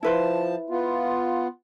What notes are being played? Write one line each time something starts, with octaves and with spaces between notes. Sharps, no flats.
F3 E4 B4 C5 A5
B3 F4